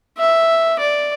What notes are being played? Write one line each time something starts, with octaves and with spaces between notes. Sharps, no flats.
E5
D5